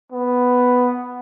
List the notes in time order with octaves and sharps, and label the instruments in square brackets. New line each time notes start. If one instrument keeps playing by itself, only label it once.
[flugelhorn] B3